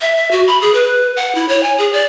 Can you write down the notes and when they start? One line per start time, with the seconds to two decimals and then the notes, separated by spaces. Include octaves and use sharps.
0.01 E5
0.16 E5
0.31 F#4
0.47 B5
0.62 G#4
0.74 B4
1.17 F#5
1.35 E4
1.49 C#5
1.63 G#5
1.78 G#4
1.93 D5